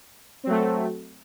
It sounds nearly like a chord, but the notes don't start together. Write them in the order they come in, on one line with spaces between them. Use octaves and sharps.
C4 F#3 A3